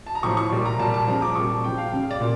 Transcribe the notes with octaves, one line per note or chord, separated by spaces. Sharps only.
A5
A#5
A2 F3 C#6
C#6
A#2 G3
A#5
A#2 G3 A5
A5
C#3 F3 A#5
D6
A#2 G3 C#6
A5
C#3 F3 G5
F5
C#3 G3 F5
D5
A#2